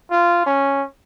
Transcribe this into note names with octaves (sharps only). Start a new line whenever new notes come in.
F4
C#4